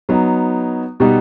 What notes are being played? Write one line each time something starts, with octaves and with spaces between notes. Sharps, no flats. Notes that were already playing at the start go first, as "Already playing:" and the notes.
F#3 B3 D#4
B2 G3 B3 D#4 G4